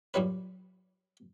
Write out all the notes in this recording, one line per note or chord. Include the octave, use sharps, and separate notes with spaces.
F#2 A#2 G3 C#4 B4